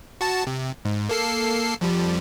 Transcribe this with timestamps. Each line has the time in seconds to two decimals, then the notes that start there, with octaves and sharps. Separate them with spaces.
0.21 F#4 A5
0.47 C3
0.85 G#2
1.09 A#3 A4 C7
1.81 F2 F3 G3